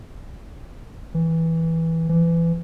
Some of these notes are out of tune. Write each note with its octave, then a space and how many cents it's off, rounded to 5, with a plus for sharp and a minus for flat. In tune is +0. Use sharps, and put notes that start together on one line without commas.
E3 -10
E3 +25